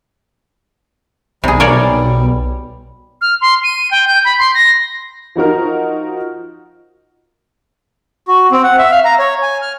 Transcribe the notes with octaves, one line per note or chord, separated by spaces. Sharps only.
B1 C3 G3 G#4
A#3 C#5 D5
F6
C6
D#7
G5
G6
B5
C6
A#6
F3 D#4 F#4 A#4
F#4
C4
F#5
E5
F5
A#5
C#5
G#5
F6